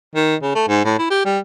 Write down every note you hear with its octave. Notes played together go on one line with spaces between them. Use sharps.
D#3
C#3
A3
G#2
A2
E4
G4
G3